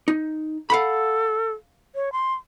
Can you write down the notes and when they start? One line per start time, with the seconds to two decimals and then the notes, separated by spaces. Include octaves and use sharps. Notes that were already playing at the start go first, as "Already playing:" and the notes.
0.08 D#4
0.70 A4 F5 F#5 B5
1.95 C#5
2.13 C6